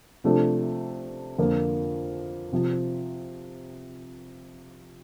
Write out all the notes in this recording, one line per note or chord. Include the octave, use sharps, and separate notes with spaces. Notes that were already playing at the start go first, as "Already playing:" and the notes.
C3 F3 A3 D4
F2 D3 F3 A#3
C3 F3